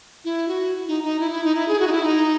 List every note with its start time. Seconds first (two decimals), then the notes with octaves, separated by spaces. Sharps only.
0.25 E4
0.48 F#4
0.88 D#4
1.03 D#4
1.20 E4
1.31 E4
1.44 D#4
1.55 E4
1.68 G#4
1.80 F#4
1.87 D#4
1.92 E4
2.03 D#4